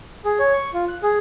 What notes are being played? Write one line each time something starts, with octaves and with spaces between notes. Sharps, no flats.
G#4
C#5
C#6
F4
F#6
G#4